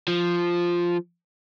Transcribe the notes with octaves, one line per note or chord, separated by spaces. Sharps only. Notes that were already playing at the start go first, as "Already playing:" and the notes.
F3